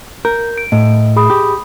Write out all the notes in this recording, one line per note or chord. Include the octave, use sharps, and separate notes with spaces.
A#4 G6
D7
A2 D#5
G#4 B5 D#6
G4